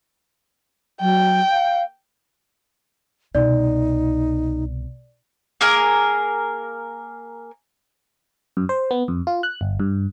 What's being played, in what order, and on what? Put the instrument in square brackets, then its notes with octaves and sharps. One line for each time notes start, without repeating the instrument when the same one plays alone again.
[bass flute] F#3 [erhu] G5
[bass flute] F5
[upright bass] C2 B2 [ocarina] D#4 [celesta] D5
[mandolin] A#3 G#4 A#4
[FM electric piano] F#2
C5
B3
F2
F4
F#6
G1
G2